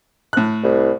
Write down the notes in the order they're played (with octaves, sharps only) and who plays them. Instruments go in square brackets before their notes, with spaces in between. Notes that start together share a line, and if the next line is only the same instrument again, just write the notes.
[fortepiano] A2 F#6
[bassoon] C2